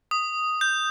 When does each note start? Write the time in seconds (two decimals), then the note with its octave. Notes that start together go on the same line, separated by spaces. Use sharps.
0.11 D#6
0.61 G6